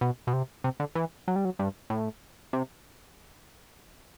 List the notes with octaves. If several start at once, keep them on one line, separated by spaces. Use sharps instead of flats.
B2
B2
C3
C3
D3
E3
F#3
G3
F#3
G2
A2
C3